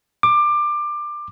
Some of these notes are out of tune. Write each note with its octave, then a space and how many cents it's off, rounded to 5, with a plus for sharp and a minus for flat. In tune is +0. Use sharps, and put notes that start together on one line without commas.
D6 +20